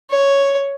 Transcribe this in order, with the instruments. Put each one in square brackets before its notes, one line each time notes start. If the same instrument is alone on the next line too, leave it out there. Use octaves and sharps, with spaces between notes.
[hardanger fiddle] C#5